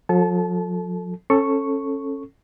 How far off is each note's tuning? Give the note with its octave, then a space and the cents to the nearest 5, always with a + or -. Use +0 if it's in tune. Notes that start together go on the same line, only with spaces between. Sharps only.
F3 +45 A4 +5 A5 -30
C#4 -25 A4 +5 C#6 +0